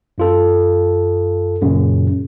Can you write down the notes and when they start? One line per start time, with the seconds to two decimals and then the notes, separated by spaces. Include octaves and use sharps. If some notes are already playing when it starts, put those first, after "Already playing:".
0.18 F#2 F4 A4
1.61 F#2 A#2 C#3